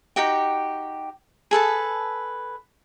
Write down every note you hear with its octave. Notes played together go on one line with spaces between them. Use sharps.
D#4 F#4 G4 G5
G#4 A4 B4 A5